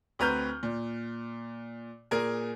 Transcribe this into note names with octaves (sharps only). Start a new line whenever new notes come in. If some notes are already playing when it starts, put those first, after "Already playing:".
D2 C4 B4 A#5 F6 G6
A#2
A#2 G#4 A#4 G#5